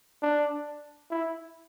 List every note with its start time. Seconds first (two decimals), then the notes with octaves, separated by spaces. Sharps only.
0.22 D4
1.11 E4